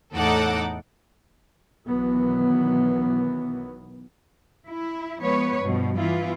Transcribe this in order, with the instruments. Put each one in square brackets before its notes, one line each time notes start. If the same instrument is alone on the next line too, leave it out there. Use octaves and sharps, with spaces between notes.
[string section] E2 A2 D#4 A4 F#5 D6
[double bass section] B1 D#3 E3 F#3 B3
[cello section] E4
F3 G#3 B3 B4 C#5
G2 B2 F3
E3 B3 E4 F4